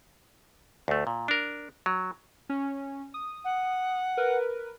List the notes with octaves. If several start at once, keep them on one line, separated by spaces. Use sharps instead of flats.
D2 A3
A#2
D4 A#4
F#3
C#4
D#6
F#5
A#4 B4